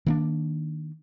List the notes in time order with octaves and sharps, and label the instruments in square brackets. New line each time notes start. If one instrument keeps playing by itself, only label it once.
[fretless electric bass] D#3 A#3 D4